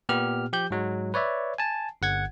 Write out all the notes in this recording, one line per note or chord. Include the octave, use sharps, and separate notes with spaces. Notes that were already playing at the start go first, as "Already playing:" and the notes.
A#2 B3 G4 F6
F3 G4 G6
G#2 F#3 G#3
B4 C#5 D5 E5
G#5 A5
G1 F#5 G#6